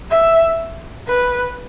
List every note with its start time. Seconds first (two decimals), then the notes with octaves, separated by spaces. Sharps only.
0.11 E5
1.08 B4